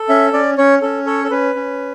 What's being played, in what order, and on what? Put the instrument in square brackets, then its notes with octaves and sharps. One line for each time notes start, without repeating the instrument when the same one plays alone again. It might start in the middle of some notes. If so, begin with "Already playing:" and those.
Already playing: [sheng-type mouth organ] A4
C#4 E5
C#4 D5
C#4 C#5
C#4 A4
A4 C#5
A4
C#4 B4
C#4